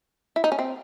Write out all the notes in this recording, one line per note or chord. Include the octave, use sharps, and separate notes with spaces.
E4
D#4
C#4
C4